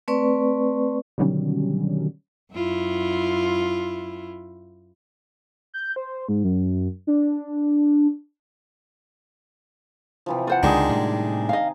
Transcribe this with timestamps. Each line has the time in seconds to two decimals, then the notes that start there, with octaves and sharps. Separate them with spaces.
0.08 A3 C4 B4 D5 C#6
1.18 B2 D3 D#3 F#3 G3 C#4
2.54 F#2 E4 F4
5.74 G6
5.96 C5
6.29 G#2
6.44 F#2
7.07 D4
10.26 C3 E3 F3
10.47 F4 C5 F#5
10.63 C#2 D3 D#3 G#3 D4 G#4
10.89 A2 C3 G3
11.49 D#5 F5